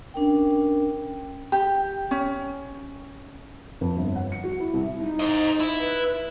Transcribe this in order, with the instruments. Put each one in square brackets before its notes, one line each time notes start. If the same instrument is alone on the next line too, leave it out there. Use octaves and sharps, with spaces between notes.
[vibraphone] C#4 D4 A#4 G5
[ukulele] G4
C#4
[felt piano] F2
G1
F#5
C#7
F#4
E4
C2
[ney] D#4
[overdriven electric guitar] C5 D#5
E4
[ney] B4